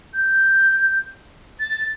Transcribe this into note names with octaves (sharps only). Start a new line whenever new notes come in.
G6
A6